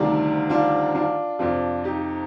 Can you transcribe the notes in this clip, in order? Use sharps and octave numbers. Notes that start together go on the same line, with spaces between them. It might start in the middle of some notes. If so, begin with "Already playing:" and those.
Already playing: D2 C3 D#3 G3 D4 F4
D4 F4
D4 F4
F2 C3 F3 D4 F4
D#4 G4